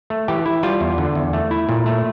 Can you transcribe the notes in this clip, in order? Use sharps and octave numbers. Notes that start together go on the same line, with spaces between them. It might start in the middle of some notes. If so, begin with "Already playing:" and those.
A3
E3 G4
E4
G3 F4
E2
D3
E2
A3
E4
A#2
A3